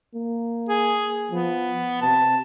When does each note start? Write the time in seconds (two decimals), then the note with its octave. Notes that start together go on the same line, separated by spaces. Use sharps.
0.14 A#3
0.69 G#4
1.31 F3 B3
2.02 C3 A5